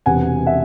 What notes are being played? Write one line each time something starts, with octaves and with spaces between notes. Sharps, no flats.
E1 E2 C3 F#5 G#5
E5 F#5